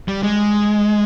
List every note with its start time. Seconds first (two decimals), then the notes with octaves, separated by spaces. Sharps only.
0.08 G3
0.23 G#3